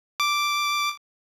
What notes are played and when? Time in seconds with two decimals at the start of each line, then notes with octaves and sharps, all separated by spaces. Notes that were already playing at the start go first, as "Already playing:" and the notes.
0.20 D6